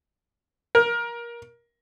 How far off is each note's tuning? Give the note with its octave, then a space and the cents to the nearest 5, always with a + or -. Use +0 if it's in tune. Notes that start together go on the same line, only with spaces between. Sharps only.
A#4 +20